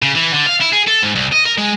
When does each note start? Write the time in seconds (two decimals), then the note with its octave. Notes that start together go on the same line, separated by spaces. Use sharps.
0.03 C#3
0.15 E3
0.34 D3
0.47 F5
0.61 E4
0.73 G#4
0.88 A4
1.03 G#2
1.16 C2
1.32 D#5
1.45 A#4
1.58 G#3